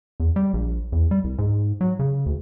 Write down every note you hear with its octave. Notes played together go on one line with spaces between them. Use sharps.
E2
G3
A#1
E2
G3
C2
G#2
F#3
C#3
D2